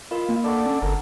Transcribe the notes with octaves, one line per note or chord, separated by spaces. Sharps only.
F4 A#4 D#5 B5
A#3
D4 A4 D5 F#5 C#6
C#4
G1 A4 A#4